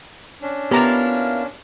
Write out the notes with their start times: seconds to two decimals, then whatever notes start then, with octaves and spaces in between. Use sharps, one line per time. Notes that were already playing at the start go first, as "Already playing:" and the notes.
0.42 C#4 D4
0.71 A#3 B3 E4 F4 G4 A#5